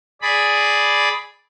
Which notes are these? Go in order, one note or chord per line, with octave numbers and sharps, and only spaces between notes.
G#4 D5 B5